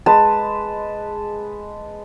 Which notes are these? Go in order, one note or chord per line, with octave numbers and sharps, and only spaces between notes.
G#3 B4 A5